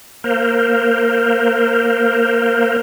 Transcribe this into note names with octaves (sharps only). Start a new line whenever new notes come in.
A#3 A#4 C5